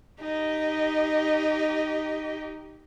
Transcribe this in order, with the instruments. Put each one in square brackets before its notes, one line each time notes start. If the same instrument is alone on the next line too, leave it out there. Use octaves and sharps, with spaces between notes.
[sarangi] D#4 [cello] G4 D#5